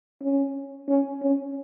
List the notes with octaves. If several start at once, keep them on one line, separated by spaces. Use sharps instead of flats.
C#4
C#4
C#4